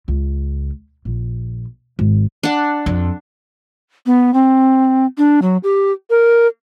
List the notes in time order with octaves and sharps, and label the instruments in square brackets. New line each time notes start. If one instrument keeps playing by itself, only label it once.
[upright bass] C#2
A#1
G#1
[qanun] D4 F#5
[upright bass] F2
[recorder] B3
C4
D4
F#3
G4
A#4